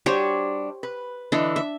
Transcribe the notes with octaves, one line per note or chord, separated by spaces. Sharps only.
G3 D4 F#4 G4 C5 C#5
B4
D3 E3 D4 D#5
E5